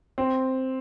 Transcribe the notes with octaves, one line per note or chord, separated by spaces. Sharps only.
C4